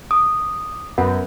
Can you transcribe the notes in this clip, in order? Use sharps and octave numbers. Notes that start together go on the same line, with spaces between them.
D6 D#6
F#2 B3 C#4 B4